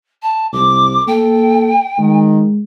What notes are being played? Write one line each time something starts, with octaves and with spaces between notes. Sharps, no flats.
A5
C2 D6
A#3 A4 G5
D#3 G#3